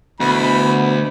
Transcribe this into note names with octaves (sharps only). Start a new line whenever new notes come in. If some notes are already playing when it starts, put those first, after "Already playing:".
D2 B2 E3 B5